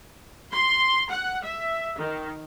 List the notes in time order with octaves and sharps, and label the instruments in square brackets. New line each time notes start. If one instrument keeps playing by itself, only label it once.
[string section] C6
F#5
E5
D#3